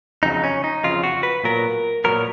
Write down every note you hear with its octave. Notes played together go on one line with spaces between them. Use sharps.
F2 C#3 F#3 D#4
C#4
D#4
F2 C#3 F#3 F4
F#4
B4
A#2 F#3 B3 A#4
A#2 F#3 B3 A#4